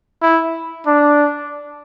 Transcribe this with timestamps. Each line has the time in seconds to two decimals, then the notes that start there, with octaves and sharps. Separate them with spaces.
0.22 E4
0.87 D4